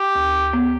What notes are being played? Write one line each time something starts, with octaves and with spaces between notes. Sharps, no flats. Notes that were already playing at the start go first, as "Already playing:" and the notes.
Already playing: G4
D2
B3